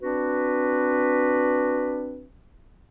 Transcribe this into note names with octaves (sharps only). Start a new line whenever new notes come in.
C4 D4 F#4 B4